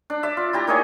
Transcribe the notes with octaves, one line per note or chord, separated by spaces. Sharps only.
D4
D5 E5
F4
E4 G4 A#5
A#3 D#4 G#4 C#5